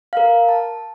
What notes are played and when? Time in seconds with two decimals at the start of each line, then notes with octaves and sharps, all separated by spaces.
0.13 A#4 F5
0.49 A5